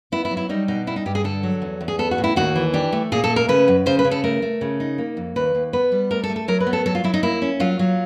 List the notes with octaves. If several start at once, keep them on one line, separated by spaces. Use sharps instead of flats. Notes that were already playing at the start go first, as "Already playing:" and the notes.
B3 E4
E4
F#3
E4
G3 D#4
B2 D#4
G3 E4
D#4
G2 G4
G#4
D3 A4
F#3
E2
E2
G#4
B3 A4
F#4
A2
E4
D#2 F#4
E3
D4 G4
A3
A#2 G#4
A4
A3
A#4
C#3 B4
F#2
C#3 C5
B4
C#3
A4
A3 A#4
A3
C#3
D#4
A#3
F2
D#2 B4
D#2
B3 B4
G3
A3 A#4
A4
A3
A4
F#3 A#4
B4
B3
A4
F#3 A4
F4
F#3 E4
D#4
A#3 E4
C#4
F#3 F4
F#3